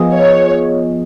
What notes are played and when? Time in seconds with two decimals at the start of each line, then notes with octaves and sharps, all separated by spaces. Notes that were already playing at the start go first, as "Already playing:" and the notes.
Already playing: F3 B3 F4 G#4 D#5
0.12 C#5